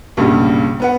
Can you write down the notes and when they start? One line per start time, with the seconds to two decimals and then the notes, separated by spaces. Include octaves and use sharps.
0.17 B1 G2 A#2 C#3 G3
0.80 B3 B4 F#5